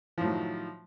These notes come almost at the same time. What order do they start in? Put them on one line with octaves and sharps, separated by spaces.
F3 A2 F#3 D#3